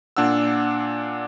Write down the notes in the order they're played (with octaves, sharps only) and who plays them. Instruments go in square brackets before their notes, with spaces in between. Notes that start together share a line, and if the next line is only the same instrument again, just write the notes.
[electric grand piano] A#2 D4 F#5 E6